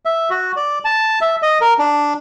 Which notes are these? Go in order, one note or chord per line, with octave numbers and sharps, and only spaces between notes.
E5
F#4
D5
A5
E5
D#5
A#4
D4